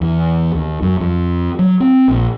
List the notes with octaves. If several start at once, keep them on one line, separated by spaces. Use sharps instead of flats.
E2
D#2
F#2
F2
F#3
C4
A#1